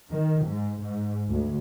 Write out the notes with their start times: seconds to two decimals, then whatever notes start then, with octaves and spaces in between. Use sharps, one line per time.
0.12 D#3
0.46 G#2
0.82 G#2
1.29 D2